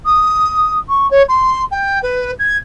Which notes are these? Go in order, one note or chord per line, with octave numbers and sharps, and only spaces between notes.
D#6
C#6
C#5
C6
G5
B4
G#6